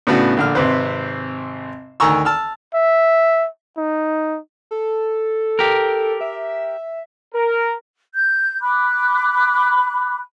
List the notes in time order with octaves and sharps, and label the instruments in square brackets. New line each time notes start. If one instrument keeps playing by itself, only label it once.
[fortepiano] A2 C#3 B3 D4 F#4
A#1 D3 F6
G#1 C3 B4 C5
D2 D#3 G#5 A#5 C#6 E6
A5 E6 F6
[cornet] E5
D#4
[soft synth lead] A4
[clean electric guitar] G4 A#4
[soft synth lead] E5
[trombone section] A#4
[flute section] G6
B5 D6 F#6